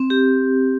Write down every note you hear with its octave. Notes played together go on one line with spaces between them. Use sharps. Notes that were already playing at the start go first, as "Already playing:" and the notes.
Already playing: C4
G4